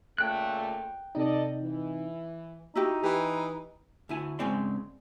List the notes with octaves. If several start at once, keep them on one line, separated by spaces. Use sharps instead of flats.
A#2 C#3 A3 G5 F#6
C3 D#4 A4 D5 D#5
E3
D#4 E4 F#4 G4
E3 G4
D2 E4 G#5
G#2 C#3 G#3 C4 D5 C6